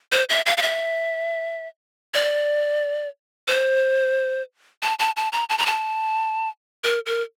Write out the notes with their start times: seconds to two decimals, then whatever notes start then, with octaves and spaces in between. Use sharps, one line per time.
0.12 C5
0.29 E5
0.46 F5
0.57 F5
0.62 E5
2.14 D5
3.48 C5
4.83 A5
4.99 A5
5.17 A5
5.33 A#5
5.50 A5
5.58 A#5
5.66 A5
6.84 A#4
7.06 A#4